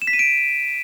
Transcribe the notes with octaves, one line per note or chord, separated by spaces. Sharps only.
E7
B6
D#7
D7